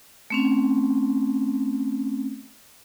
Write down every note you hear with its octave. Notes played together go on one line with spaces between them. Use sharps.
A3 C4 C#4